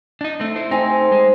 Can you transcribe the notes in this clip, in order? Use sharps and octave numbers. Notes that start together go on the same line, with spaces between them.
D4 D#4
A3 C4
E4 C5
A3 C4 D#4 G#5
G#3